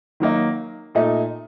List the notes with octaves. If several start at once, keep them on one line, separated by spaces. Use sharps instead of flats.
D#3 F#3 A#3 D#4
A#2 A3 D#4